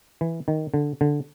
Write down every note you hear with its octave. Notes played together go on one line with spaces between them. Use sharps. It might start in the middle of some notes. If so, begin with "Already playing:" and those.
E3
D#3
D3
D3